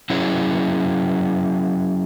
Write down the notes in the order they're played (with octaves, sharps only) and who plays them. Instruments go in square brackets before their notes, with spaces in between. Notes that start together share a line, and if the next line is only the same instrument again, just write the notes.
[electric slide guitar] F#3 C#4 E4 G#4 C#5